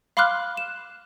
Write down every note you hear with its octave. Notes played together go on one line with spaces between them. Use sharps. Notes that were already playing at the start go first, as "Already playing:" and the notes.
F5 B5 C6 D6 F6 F#6
E7